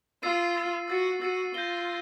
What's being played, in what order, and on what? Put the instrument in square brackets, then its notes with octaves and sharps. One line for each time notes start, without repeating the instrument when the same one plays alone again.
[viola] F4 [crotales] E6 A6 C7 D#7
[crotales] E6 A6 C7 D#7
[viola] F#4 [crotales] E6 A6 C7 D#7
[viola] F#4 [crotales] E6 A6 C7 D#7
[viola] F4 [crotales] G6 A#6 D#7 G7